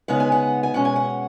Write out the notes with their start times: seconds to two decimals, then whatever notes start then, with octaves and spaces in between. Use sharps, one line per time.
0.08 C#3 G#3 B3 D#4 F#5
0.20 G#5
0.32 F#5
0.63 G#5
0.74 B2 G#3 C#4 F#5
0.85 G#5
0.96 F#5